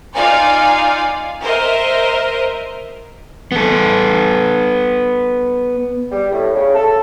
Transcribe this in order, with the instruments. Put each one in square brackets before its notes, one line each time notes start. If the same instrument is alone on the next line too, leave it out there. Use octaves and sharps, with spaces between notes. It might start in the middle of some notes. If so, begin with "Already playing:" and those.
[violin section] D#4 F4 D5 F5 G#5
A#4 C5 D#5 E5
[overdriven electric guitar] B3 A4
[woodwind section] G3
A2
C#3
A4